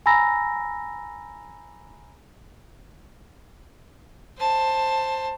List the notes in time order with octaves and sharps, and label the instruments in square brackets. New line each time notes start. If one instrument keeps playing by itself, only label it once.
[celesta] G#5 A#5 B5 E6 A#6
[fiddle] C5 A5